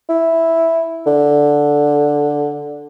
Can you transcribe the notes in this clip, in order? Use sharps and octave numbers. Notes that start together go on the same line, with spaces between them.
E4
D3